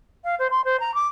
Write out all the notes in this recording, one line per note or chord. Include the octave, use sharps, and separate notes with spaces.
F5
C5
C6
C5
A#5
D6